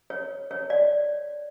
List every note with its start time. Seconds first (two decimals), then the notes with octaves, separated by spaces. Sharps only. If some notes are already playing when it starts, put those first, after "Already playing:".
0.10 C#5
0.51 C#5
0.70 D5